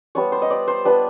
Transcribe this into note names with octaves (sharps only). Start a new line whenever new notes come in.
G3 B3 D4 F4 C#5
C5
D#5
D5
C5
G3 B3 D4 F4 B4